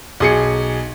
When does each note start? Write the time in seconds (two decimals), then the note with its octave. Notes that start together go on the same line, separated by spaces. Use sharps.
0.20 B1 G#4 C#7